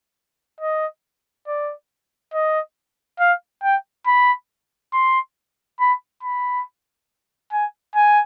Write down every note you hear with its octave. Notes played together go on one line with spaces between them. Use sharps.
D#5
D5
D#5
F5
G5
B5
C6
B5
B5
G#5
G#5